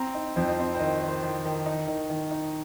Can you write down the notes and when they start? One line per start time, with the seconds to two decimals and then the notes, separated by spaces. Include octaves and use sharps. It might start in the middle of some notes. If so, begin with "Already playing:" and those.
Already playing: C4 A#5
0.14 D#4
0.36 F2 C5
0.48 D#5
0.59 C4 C5
0.75 C5
0.79 D#3 D#5
1.02 D#3
1.08 C5
1.23 D#3
1.45 D#3
1.66 D#4
1.88 D#3
2.10 D#3
2.31 D#4